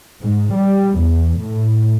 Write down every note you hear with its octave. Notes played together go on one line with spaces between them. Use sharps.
G#2
G3
E2
A2